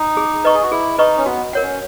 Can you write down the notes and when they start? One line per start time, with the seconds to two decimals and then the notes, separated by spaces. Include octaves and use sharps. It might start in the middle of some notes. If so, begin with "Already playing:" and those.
Already playing: D#4
0.17 G#4
0.44 B4 D#5 A#5 C#6
0.54 G#4
0.63 F#4
0.71 E4 G#4
0.98 D#4 B4 D#5 A#5 C#6
1.17 C#4
1.26 B3 F#4
1.53 A#4 C#5 F#5
1.62 C#4